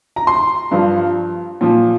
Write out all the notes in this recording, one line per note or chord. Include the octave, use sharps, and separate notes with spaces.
A#5
C6
G2 F3
A#2 F3